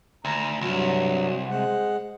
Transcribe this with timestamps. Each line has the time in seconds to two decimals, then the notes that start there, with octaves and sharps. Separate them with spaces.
0.25 D2 A#5
0.61 C2 G2 F#3 F#4
1.49 G#3 C5 F#5